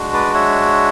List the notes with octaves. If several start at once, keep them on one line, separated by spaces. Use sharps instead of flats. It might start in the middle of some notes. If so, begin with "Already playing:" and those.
Already playing: G#3 D4 F#4
B4 D5
C#5 E5